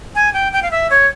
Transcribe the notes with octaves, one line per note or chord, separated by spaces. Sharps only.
G#5
G5
G5
F5
E5
C#5